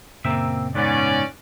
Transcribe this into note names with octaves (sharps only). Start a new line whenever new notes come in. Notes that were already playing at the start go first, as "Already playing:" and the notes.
F#2 A#2 C#3 A#3 C4 E5
G#2 B3 C#4 D5